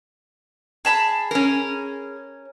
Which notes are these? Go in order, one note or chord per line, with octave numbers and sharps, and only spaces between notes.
G#4 A5 B5
C#4 A#4